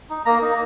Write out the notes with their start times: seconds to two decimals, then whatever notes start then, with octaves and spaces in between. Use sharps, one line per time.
0.10 D#4
0.25 A#3 A#5
0.42 D#4